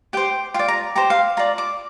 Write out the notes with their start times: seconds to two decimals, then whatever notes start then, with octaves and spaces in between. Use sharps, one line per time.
0.13 G4 C5 G5
0.54 F4 G5
0.59 D5
0.68 A#5
0.95 G4 C5 A#5
1.10 F5
1.37 F4 D5 A#5
1.58 D6